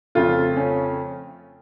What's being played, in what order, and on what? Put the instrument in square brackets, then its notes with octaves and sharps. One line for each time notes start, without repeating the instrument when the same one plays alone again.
[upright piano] F2 C#3 A3 F4
C#4